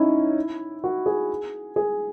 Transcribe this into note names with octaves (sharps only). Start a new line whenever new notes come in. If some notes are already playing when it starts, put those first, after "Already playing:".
Already playing: C#4 D#4 E4
F#4
G#4
G#4